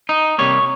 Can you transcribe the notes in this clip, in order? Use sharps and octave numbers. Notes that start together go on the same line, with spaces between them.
D#4
C3 G3 A#3 C#5